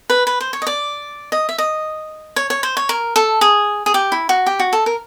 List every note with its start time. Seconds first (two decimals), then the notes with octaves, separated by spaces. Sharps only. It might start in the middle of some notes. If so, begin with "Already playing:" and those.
0.10 B4
0.27 B4
0.41 C5
0.53 C#5
0.62 D#5
0.67 D5
1.32 D#5
1.49 E5
1.58 D#5
2.36 C#5
2.50 C#5
2.63 C5
2.77 C#5
2.89 A#4
3.16 A4
3.41 G#4
3.86 G#4
3.94 G4
4.12 E4
4.29 F#4
4.47 G4
4.59 F#4
4.73 A4
4.86 A#4